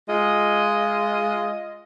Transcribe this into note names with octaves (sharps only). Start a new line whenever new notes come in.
G#3 F4 D#5